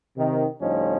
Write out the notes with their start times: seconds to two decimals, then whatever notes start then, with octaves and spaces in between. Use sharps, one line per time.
0.17 C3 D#3
0.60 D2 A2 F3 G3 C#4 D#4